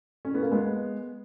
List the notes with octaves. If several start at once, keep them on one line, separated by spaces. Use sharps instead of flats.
C#4
B3
A#3
G#3 B3